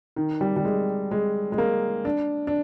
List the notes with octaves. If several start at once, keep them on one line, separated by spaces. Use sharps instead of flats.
D#3
G3
G3
G#3
G#3
G#3
A#3
D4
D4